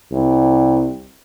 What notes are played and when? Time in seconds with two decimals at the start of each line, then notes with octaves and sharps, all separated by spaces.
0.12 C2